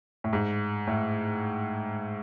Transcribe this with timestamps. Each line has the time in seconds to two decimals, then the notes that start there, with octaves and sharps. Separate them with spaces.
0.24 A2
0.33 G#2
0.87 A2